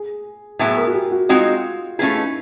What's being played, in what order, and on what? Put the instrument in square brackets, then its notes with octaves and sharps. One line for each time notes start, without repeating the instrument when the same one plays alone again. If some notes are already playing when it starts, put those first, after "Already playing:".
Already playing: [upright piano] G#4
[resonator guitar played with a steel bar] A2 F#3 B3 E4 [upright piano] G#4
[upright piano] A#4
F#4
G4
F#4
[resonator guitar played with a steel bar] G#3 C4 D#4 F#4 [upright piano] F4
[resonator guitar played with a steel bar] A3 C#4 F4 G#4 B4 [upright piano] E4
[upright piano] D#4